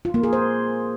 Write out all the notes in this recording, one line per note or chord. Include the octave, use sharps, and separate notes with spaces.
F4
A#3
G#4
C5